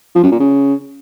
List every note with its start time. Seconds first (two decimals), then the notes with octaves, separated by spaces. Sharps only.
0.15 F3
0.23 F#2
0.31 A#2
0.40 C#3